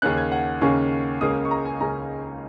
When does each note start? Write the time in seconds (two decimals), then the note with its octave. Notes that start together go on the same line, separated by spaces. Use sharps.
0.02 D#2 C#3 A#3 C#4 F#6
0.17 G#6
0.32 F#5
0.61 D#2 C#3 A#3 C#4 C#6
1.21 C#2 C#3 A#3 C#4 D#6
1.45 C#6
1.51 A#5
1.65 G#5
1.80 C#2 C#3 A#3 C#4 A#5